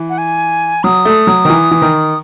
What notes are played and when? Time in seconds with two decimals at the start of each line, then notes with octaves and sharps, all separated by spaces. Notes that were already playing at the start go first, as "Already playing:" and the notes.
Already playing: E3
0.10 F#5
0.18 G#5
0.84 F#3 D#6
1.05 A3
1.27 F#3
1.45 D#3
1.50 E3
1.71 E3
1.82 D#3